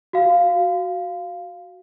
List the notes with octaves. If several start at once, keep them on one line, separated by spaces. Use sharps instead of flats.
F#4 F5